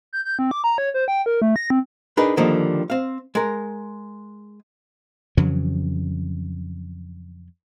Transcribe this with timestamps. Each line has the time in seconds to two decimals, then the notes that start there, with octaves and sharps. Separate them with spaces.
0.13 G6
0.25 G6
0.39 C4
0.51 D6
0.64 A#5
0.78 C#5
0.94 C5
1.08 G5
1.26 A#4
1.42 A3
1.56 A#6
1.70 C4
2.17 D4 D#4 G#4 A#4 B4
2.37 D3 D#3 F3 G3 A#3
2.90 C4 F5
3.35 G#3 A#4
5.37 F2 C#3 E3 F#3